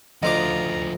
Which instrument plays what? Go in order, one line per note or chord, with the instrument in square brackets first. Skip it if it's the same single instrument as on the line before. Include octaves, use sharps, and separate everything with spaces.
[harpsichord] D2 C5 D6 [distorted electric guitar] F3 D#4 [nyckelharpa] F4 A#5 [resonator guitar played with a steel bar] D#5